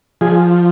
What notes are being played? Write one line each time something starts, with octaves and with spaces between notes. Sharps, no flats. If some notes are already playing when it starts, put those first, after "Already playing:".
F3 G#4